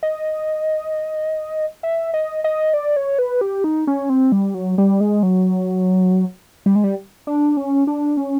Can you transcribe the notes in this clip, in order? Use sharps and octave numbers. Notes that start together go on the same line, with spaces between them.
D#5
E5
D#5
D#5
D5
C#5
B4
G4
D#4
C#4
C4
G3
F#3
G3
G#3
F#3
G3
G#3
G3
D4
C#4
D4
C#4